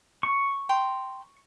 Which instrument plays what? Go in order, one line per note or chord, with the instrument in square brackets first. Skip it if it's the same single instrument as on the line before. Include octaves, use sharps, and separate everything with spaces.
[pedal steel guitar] C#6
[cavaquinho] G5 A#5 C6